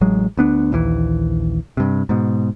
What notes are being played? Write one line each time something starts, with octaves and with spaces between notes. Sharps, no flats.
A1 F#3 G#3
D2 B3 D4
A#1 D#2 E3
G2 C3
G#2 B2